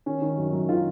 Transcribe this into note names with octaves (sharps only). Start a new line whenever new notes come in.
D#3 C#4
D#3
F#2
F#2
D#3 F4